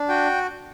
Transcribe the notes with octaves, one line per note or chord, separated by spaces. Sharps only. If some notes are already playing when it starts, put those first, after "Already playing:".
Already playing: D4
F#4 G5